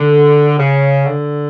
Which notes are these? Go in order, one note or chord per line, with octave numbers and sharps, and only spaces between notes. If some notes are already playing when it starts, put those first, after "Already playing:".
Already playing: D3
C#3
D3